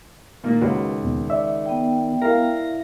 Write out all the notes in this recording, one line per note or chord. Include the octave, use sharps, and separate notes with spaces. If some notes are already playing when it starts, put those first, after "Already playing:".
A#2 D#3 A#3
C#2 F#4 B4
D#2 B2
D5 E5
B3 G5
E4 A#4 F5 A#6